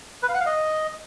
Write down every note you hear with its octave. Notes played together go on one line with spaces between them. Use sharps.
B4
F5
F#5
F5
D#5